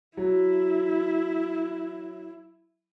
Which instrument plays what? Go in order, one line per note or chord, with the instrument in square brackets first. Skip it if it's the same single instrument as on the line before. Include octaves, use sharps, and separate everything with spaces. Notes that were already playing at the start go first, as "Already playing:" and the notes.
[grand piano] F#3 [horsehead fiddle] E4